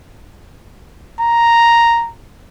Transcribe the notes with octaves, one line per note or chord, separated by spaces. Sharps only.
A#5